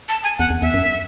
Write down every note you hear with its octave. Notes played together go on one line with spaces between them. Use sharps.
A5
G#5
E2 F#5
E2
E2 E5
F#2